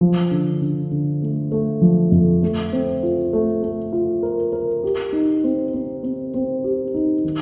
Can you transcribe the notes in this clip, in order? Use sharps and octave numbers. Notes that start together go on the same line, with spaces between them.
F3
D3
D3
D3
A3
A3
F3
F2
A3
C4
F4
A3
A3
F4
A#4
A#4
G4
D#4
C4
C4
C4
C4
G4
D#4
D#3